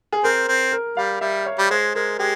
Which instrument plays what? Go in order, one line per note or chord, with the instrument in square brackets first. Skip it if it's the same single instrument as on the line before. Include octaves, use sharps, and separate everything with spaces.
[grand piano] G#4
[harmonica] C4 [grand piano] A#4
[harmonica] C4
[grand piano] A#4
[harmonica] G3 [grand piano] F5
[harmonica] G3 [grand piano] E5
[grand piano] C#5
[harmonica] G3
[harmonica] G#3 [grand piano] C5
[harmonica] G#3 [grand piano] A#4
[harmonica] G#3 [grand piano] G4